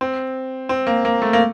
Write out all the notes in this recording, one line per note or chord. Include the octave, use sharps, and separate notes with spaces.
C4
C4
A#3
A#3
A3
A#3